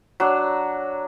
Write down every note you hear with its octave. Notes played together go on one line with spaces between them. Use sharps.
F#3 D4